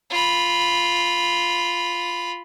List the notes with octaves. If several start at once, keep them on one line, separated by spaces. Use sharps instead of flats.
F4 B5